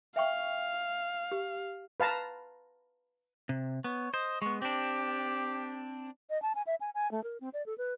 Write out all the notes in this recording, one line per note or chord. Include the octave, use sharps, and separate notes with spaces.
E5 F5 G5 C#6
G4
B4 F5 A5 A#5
C3
B3 C#5
C5 D#5
G#3 B3 C#6
C4 D4 G4
D#5
A5
G#5
E5
G#5
G#5
A3
A#4
C4
D5
A4
B4